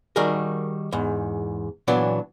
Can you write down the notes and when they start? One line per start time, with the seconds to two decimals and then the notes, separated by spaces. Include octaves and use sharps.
0.16 D#3 G3 F#4 G#4 A#4
0.92 E2 G#2
1.88 A#2 E3 F#3 B3 D4